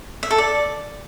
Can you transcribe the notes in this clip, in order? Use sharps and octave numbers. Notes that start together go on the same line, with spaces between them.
E5
A4
D5